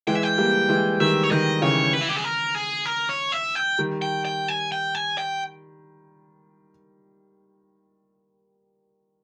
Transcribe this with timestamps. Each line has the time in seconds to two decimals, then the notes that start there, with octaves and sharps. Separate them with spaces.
0.07 E3 G#3 G5
0.15 E5
0.23 G5
0.38 G3 A#3
0.69 E3 G#3
1.00 D#3 G3 E5
1.23 C#5
1.31 D#3 G3 D#5
1.62 C#3 E3 C#5
1.93 B4
2.01 E4
2.09 G4
2.16 G#4
2.24 A#4
2.55 G#4
2.85 A#4
3.09 C#5
3.32 E5
3.55 G5
3.78 D#3 G3
4.02 G5
4.25 G5
4.48 G#5
4.72 G5
4.95 G#5
5.18 G5